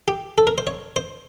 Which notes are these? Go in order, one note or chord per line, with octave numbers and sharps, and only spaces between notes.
G4
A4
A#4
C5
C#5
C5